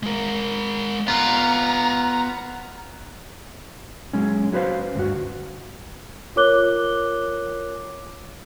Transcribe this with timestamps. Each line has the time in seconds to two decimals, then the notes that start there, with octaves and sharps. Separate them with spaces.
0.03 G#3 A#4
1.08 B3 F4 A#5
4.13 F#3 G#3 C#4
4.53 C#4 F#4 B4 C5 F5
4.95 D2 G2 F#4
6.36 F4 A#4 C#5 D6 F#6 G7